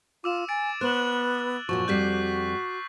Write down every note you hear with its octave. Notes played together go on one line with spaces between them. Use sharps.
F4 D6 E6 E7
G#5 A6 D7
B3 C5 F#6 E7 F#7
F#2 A#2 F3 F#4 C#6
F2 G3 C4 F#4 G6 B6 C7